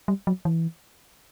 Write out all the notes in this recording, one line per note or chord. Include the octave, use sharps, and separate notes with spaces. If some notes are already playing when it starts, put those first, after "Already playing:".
G3
F#3
E3